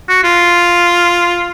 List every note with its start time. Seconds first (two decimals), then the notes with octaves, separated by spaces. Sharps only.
0.09 F#4
0.23 F4